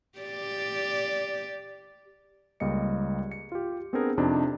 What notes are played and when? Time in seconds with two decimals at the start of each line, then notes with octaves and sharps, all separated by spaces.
0.19 G4 D5
2.60 C#2 G3 A#3 D#5 C#7
3.32 C#7
3.52 F4 G4
3.93 B3 C4 D4 G4 G#4 A#4
4.18 F2 C3 D4 D#4